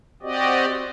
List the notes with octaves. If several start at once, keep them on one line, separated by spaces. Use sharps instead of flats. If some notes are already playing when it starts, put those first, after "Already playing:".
C4 F#4 G4 D5 D#5